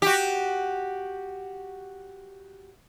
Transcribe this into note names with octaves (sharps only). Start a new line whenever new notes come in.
F#4 G4